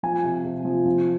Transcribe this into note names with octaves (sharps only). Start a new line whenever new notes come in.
F3 G#5
C3
C3
F3
F3